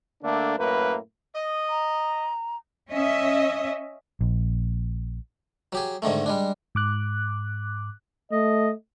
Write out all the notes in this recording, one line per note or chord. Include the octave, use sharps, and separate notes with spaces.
D3 A3 A#3 D4
F#2 A2 A#3 B4
D#5
A#5
C#4 D#5 E5
A#1
F#3 G4 G#4
G#2 D3 D#3 A3
G3 G#3 D4
G#2 D6 F#6
A3 D#5